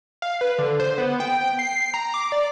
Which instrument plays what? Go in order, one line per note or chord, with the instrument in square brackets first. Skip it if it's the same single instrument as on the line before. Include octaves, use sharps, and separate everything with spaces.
[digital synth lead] F5
B4
D3
C5
B3
G5
C7
A#5
D6
D5